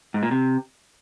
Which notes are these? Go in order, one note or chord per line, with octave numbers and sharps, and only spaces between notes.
G#2
A#2
C3